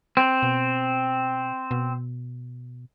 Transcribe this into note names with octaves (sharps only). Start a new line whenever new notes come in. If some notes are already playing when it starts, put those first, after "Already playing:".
C4
B2
B2